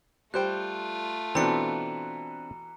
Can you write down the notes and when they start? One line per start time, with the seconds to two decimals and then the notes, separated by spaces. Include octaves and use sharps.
0.34 G3 A3 F4 C5 G5 F#6
1.35 B2 E3 C4 D4 A4 A#5 C#7